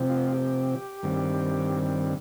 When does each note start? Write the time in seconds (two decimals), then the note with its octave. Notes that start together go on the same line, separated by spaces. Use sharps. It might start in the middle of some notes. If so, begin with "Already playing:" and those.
Already playing: C3 F3 C4
0.10 F4
0.33 G4
1.03 G2 D#3 G3 C4